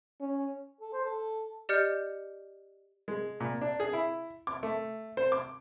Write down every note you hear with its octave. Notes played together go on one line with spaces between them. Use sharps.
C#4
A4
C5
A4
G4 D5 D#5 F6 G6 C#7
G#3
A#2
D4
G#4
E4
D6
A3
C5
D6